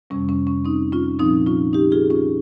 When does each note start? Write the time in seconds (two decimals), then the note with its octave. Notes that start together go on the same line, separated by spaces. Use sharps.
0.10 F2 C3 G3 C#4
0.29 C#4
0.47 C#4
0.65 C4 D#4
0.92 C#4 F4
1.19 A#2 F3 C4 D#4
1.46 C#4 F4
1.73 D#4 G4
1.92 F4 G#4
2.10 C#4 F4